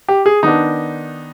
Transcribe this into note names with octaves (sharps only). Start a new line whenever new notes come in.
G4
G#4
D#3 B3 D4 D#4